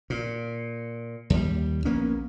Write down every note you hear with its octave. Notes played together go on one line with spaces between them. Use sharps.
A#2
D#2 G3
A#1 A#3 B3 C#4